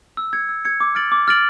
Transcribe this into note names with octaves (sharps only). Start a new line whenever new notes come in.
E6
G#6 C#7
E6
G#6 C#7
D6
F6 A6 D7 F#7
D6
F6 A6 D7 F#7